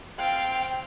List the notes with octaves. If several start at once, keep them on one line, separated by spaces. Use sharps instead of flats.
C4 F4 F5 G5